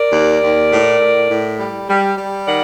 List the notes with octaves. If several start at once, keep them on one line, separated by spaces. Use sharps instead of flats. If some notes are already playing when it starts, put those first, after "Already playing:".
Already playing: A#4 D5
D#2
D#2
A2
A2
A2
G3
G3
G3
D#3 D5 F#5